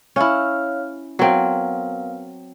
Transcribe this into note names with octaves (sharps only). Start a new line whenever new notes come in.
C#4 E4 C#5 F5 F6
F#3 B3 C4 A#4 F5